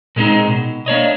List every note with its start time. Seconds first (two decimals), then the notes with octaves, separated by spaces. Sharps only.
0.16 A#2 G#3 C4 D#4
0.49 B2
0.86 A#3 D4 C#5 D#5